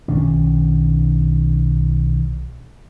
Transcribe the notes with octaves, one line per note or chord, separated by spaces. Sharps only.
B1 D#3 C#4 D4